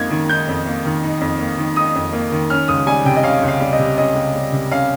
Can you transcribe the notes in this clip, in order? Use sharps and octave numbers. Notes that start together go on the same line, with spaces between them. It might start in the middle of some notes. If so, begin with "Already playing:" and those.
Already playing: F2 A#3 D#4 G#6
D#3
D#4 G6
F2
A#3
D#3
D#4
F2
A#3
D#3
D#4 D#6
F2
A#3
D#3
C#4 F6
C#2 D#6
G3 G#5
C3 G5
D#5
C#4 F5
C#2
F5
G3
D#5
C3
C#4 D#5
C#2
G3
C3
C#4 F5